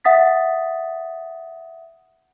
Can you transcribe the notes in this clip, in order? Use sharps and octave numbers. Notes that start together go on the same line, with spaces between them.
E5 F#5 D#6 A6 B6